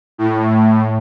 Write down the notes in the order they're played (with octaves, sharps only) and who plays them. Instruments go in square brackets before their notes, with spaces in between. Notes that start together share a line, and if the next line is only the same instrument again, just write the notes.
[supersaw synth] A2